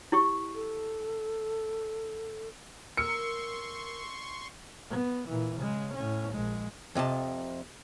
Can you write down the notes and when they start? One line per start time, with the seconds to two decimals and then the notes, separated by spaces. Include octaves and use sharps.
0.12 E4 G4 C#6
0.55 A4
2.97 A#4 C6 C#6 E6 C#7
4.90 B3
5.28 A#2 E3
5.58 C#3 G#3
5.94 A2 C#4
6.33 A#1 G#3
6.95 F2 C3 D#5 A5